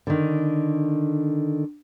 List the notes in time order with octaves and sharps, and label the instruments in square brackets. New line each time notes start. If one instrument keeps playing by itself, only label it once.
[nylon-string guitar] D3 D#3